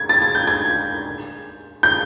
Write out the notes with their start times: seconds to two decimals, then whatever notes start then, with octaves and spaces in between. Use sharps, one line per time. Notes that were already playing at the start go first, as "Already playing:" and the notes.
Already playing: G#6
0.09 A6
0.22 G#6
0.35 G6
0.47 G#6
1.83 G6